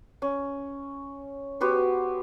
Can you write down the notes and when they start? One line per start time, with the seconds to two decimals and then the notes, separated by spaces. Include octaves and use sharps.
0.22 C#4
1.60 B3 F#4 G4 C5